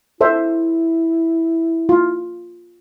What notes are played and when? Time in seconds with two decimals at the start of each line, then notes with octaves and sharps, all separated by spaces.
0.21 E4 A4 C5 E5
1.89 F4